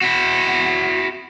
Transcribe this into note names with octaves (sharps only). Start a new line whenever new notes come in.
E4 F#4